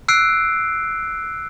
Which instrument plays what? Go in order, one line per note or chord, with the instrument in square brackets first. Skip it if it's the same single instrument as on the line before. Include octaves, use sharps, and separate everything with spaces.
[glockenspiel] E6 F#6 C7 D7